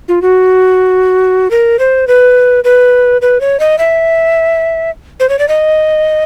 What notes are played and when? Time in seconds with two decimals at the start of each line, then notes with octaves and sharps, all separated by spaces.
0.08 F4
0.22 F#4
1.51 A#4
1.79 C5
2.07 B4
2.64 B4
3.21 B4
3.41 C#5
3.60 D#5
3.78 E5
5.20 C5
5.29 C#5
5.39 D5
5.48 D#5